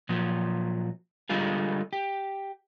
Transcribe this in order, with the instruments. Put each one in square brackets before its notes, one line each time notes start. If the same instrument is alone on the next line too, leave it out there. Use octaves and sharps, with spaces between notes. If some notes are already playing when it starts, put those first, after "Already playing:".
[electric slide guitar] A#2 F3 F#3
D3 G3 G#3 F4 G#4
G4